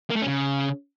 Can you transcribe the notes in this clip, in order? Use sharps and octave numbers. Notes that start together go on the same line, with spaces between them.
A#3
A3
C#4
C#3